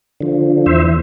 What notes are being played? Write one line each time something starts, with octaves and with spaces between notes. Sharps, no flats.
D3 F3
E2 C5 E5